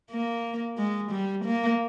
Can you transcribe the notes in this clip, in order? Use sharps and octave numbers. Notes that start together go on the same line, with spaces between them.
A#3
G#3
G3
A#3